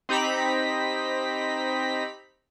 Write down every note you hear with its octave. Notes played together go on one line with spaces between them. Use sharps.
C4 D#4 G4 A#5 B5 B6